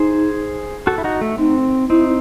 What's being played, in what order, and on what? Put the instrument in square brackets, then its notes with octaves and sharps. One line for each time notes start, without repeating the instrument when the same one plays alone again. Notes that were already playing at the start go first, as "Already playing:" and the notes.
Already playing: [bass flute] D#4 [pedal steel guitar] G#4 C5
[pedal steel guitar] F#4 A4
E4
D#4 F#4
A3
[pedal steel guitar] C4 [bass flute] D#4
[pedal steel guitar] C4 D#4 [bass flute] E4